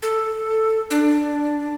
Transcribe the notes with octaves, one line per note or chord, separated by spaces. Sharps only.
A4
D4